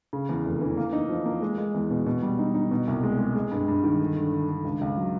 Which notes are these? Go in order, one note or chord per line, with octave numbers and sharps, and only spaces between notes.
C#3
E2
F1
E3
A#3
D#4
F3
A#3
G#3
G#3
E2
B2
B2
G3
D#4
D#4
B2
C2
G#3
G#3
G#3
G2
G2
D#3
D3
D3
D3
D3
C#2
C#2
F#3